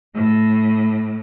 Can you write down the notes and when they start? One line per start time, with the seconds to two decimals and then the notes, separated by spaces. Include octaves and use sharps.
0.15 A2 A3